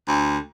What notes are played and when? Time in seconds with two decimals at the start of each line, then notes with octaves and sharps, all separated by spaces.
0.07 D2